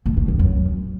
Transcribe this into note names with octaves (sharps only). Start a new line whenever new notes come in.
A#2
A2
F2
F#2